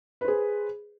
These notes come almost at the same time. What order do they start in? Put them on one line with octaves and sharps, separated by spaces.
B4 C5 G#4